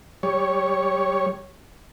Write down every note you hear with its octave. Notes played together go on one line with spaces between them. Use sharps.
G3 C#5